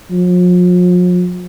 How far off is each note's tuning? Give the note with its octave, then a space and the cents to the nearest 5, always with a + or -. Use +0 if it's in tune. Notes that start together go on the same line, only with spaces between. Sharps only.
F3 +45